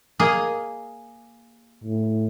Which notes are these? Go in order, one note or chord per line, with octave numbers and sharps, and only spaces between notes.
A#3 G#4 D#5
A2